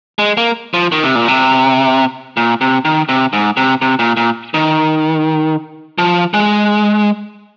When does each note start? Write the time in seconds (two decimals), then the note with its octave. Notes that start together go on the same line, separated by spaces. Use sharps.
0.19 G#3
0.37 A#3
0.74 F3
0.92 D#3
1.03 C3
1.15 A#2
1.28 C3
2.37 A#2
2.61 C3
2.85 D#3
3.09 C3
3.33 G#2
3.57 C3
3.82 C3
3.99 A#2
4.17 A#2
4.54 D#3
5.98 F3
6.34 G#3